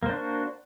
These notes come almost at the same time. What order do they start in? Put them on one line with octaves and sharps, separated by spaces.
A#3 C5 D4 F#4